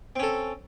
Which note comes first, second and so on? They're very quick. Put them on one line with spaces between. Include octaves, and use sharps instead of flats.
C4 C#4 A4